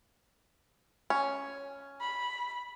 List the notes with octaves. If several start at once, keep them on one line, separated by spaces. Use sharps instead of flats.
C#4
B5